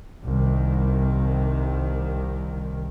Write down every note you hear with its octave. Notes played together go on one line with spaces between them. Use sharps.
C2 D#3